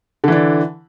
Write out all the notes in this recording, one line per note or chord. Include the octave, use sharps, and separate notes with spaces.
D3 E3 D4